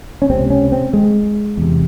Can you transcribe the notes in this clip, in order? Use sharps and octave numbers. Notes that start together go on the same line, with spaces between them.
C#4
C#2 C3 C4
C#4
C4
G#3
E2 C3